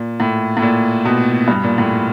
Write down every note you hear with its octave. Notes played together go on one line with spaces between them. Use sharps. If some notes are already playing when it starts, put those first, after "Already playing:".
Already playing: A#2
A2
A2
A#2
B2
G2
A#2
A2